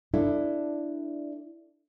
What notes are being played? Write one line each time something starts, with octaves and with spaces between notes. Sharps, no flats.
D4 E4 A4